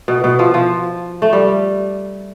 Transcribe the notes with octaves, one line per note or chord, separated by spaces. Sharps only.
B2
B2
F3
F3
A3
G3